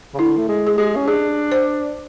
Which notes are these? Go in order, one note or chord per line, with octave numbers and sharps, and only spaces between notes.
C#3
D3 E4
A3
G#3
G#4
G#3 G4
C#4
D4 G#4
C5